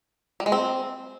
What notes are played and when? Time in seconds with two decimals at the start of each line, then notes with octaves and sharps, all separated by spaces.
0.40 G3
0.46 G#3
0.52 C4